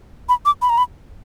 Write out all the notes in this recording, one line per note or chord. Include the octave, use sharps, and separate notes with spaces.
B5
D6
B5
A#5
B5